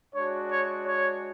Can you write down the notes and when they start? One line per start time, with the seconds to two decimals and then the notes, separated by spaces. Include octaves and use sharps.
0.14 G#3 D4 F#4 C#5
0.50 C#5
0.86 C#5